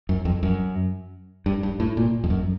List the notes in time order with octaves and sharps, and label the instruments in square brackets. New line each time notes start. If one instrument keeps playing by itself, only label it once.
[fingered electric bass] F#2
F2
F#2
G2
G2
A2
A#2
F2
F#2